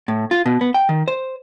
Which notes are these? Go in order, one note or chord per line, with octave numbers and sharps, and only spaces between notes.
A2
F4
B2
B3
G5
D#3
C5